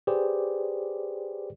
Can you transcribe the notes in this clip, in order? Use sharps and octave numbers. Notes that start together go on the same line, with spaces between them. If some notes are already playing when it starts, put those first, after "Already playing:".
G4 G#4 B4 C5 D5